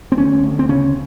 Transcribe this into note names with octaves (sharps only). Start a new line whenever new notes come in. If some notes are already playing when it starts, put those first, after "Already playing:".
C4
D2 C#4
D2
C4
C#3 C#4